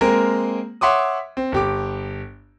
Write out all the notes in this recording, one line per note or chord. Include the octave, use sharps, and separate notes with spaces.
G#3 A#3 C4 A#4
C#5 E5 F#5 C6 D6 D#6
C4
G1 G4 D6